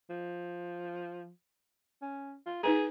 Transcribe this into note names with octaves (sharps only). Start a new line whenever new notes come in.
F3
C#4
F4
D#4 G#4 B4 A#5